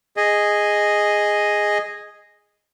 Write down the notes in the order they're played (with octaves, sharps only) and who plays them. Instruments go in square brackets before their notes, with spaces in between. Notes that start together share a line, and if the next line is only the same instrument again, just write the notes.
[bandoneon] G#4 D#5